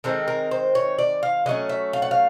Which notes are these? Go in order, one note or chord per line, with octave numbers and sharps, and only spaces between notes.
D#3 G#3 C4 D#4 A4
A#4
C5
C#5
D5
F5
D3 F#3 A3 C#4 D#5
E5
F5
F#5
F5